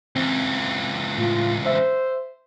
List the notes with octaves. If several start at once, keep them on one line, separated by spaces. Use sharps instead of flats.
C#2 E3 C4
A2 F4
C5 E5